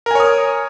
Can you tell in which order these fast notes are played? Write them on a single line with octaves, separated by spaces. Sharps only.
A#4 G#5 C#5 D#6